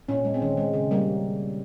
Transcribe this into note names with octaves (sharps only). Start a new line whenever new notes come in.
A#2 C#4
G#3
C4
D#3 C#4
G#3
C#3
G3 A#3